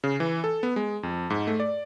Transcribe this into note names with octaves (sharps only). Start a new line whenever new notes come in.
C#3
E3
A4
B3
G#3
F2
G#2
A3
D5